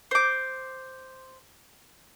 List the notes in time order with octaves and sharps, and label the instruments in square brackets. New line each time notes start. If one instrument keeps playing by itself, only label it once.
[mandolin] C5 D6